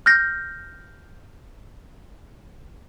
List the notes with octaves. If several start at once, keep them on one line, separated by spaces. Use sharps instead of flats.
F6 G6 A#6